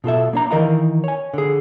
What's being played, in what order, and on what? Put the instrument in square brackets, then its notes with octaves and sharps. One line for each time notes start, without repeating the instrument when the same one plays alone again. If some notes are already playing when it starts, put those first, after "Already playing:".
[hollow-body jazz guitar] B2 F4 A4 E5
A#3 D4 A#5
D#3 E3 A#4 D#5 F5 A#5
C#5 G#5
D3 G#4